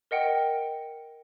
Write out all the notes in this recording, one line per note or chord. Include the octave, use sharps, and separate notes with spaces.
A#4 D#5 F#5 G5